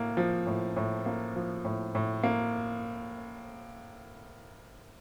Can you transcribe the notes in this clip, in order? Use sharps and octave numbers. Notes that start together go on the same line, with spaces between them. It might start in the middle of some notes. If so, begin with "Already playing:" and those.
Already playing: A2 A#3
F3
A2
A2
A#3
F3
A2
A2
A#3